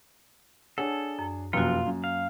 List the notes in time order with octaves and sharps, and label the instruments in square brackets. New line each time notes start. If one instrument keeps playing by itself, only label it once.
[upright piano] D4 G#4 C#5 [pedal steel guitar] A4 [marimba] F#5
[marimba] F#2
[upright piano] F1 F#2 [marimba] A#3 F#4 [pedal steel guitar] F4
[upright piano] F#2
[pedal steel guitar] F5